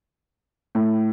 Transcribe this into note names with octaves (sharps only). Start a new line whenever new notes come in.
A2